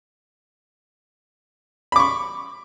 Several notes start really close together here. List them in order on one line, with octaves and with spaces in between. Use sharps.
B5 D6 C#6